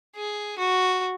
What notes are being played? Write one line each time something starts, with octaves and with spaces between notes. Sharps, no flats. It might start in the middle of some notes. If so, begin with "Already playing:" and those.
G#4
F#4